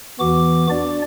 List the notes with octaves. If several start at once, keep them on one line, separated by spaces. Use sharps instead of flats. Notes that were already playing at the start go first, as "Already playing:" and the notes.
E2 E3 B3 F#4 D6
D4 D5